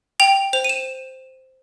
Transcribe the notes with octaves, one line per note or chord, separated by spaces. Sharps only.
G5 F7
C5 F7
D#7
E7